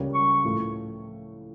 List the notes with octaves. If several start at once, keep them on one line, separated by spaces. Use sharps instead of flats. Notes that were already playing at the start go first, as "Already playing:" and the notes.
Already playing: C#2 C#3 G3 A#3 C#4
C#6
A2 F3 A3